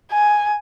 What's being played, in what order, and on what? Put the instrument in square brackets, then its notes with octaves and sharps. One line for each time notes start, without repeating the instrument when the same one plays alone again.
[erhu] G#5